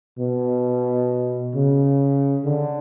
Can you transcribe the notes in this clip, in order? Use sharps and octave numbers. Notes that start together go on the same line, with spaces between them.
B2
C#3
D3